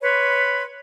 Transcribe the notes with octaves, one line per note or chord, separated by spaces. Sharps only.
B4 C#5 B5 C6